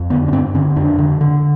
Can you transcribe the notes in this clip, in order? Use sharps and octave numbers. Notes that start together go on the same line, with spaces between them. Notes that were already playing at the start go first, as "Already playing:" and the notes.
Already playing: F2
D3 B3
C#4
G2 C4
D3 C#4
F2 D4
D3
D3